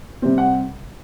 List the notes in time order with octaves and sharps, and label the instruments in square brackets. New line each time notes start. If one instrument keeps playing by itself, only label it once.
[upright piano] C3 G3 C4
F#5